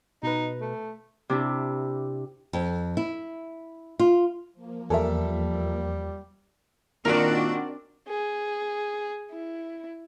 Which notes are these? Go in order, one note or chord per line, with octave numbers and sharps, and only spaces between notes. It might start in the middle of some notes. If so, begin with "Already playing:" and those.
B2 D#4 B4
A3
C3 D4 E4
F2
E4
F4
F3 A#3
E2 G3 A4 A#4 E5
A#2 D#3 C4 D4 F#4 A#4 D5
G#4
E4